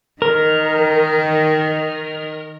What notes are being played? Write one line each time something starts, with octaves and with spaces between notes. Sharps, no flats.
D#3 A#4